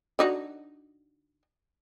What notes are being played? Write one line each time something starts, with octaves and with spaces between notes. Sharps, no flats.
D3 D#4 F#4